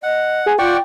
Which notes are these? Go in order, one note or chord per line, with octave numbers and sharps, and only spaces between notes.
D#5 F#5
G#4
F4 D5 F#5 G5 C#6